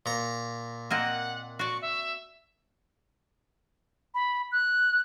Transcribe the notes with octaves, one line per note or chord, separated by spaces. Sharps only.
A#2 A#5
A#3 C4 D#5 F#5
F#4 D5 C#6
E5
B5
F#6